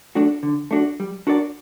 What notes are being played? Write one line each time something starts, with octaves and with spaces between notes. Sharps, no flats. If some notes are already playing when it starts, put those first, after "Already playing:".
A3 D4 F#4
D3
A3 D4 F#4
G3
D4 F#4 A#4 D5